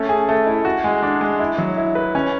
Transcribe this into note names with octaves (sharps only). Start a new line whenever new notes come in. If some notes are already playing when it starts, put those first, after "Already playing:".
Already playing: A3 C#4
G#4
A3
E4
F#4
G#3
D4
G#3
E4
F#3
E4
B4
C#4